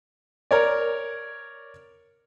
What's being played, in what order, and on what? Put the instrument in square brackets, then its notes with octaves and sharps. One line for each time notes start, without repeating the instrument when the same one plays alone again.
[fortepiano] A#4 C#5 D5